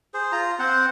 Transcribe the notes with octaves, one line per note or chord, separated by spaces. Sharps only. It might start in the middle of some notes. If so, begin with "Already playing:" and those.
G#4 C5
F4 A#5
C4 C5 F#5